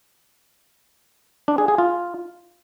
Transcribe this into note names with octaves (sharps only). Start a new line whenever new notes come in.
D4
G#4
G#4
F4